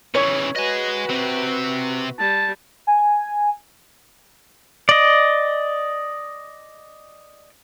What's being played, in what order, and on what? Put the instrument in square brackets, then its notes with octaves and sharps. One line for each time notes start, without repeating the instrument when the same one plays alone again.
[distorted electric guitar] C#3 E3 [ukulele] C#5
[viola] F#4 B4 [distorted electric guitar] D#5 G#5
[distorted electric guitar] C3 C4
[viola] G3 [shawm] A5
[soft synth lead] G#5
[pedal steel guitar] D5 D#5